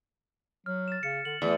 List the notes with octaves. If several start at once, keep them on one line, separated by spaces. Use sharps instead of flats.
F#3 F6
A6 E7
C#3 C#7
D3 F#7
E2 A3